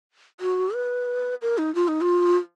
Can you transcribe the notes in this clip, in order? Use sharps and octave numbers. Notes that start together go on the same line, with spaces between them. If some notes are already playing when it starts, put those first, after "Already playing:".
F#4
B4
A#4
D#4
F4
D#4
F4